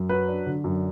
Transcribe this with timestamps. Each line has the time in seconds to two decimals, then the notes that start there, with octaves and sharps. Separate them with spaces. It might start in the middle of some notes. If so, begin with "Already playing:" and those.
Already playing: F#2
0.09 F#3 B4
0.28 D4
0.46 D3
0.64 F#2